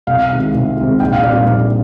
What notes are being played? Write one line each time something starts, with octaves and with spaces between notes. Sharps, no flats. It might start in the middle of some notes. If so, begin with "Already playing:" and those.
C2 F5
C3 D#3 G#3
C2
C3 D#3 G#3
A#1 G5
F5
A#2 G3 C4 D#4 D5
F5
A#1